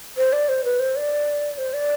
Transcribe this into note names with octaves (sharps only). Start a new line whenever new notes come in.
C5
D5
C5
B4
C5
D5
C5
D5